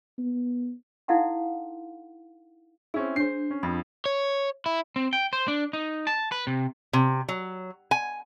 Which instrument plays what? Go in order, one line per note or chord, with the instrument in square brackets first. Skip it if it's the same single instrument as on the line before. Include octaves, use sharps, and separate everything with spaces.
[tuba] B3
[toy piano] D#4 E4 A4 F5 F#5 C6
[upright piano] C4 C#4 E4 [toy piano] G#4
[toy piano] D4 [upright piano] C5 C7
[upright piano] C#4
[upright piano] F2 F3 [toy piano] B5
[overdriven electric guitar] C#5
E4
[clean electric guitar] C4
G5
C5
D4
D#4
A5
B4
C3
[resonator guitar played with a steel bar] C3
F#3
G#5